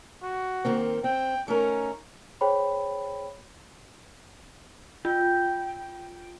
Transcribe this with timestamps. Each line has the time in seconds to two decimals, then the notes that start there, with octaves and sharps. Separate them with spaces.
0.22 F#4
0.65 D#3 A#3 C4
1.04 C4 G5
1.48 A3 C#4 D#4 A#4
2.41 G#4 C5 C#5 G5 B5
5.05 F4 G5